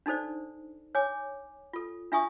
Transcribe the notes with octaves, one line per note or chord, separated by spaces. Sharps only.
D4 D#4 A4 C5 D5
C#5 G#5 D6
F4 A4
D4 F4 E5 G#5 C#6 D#6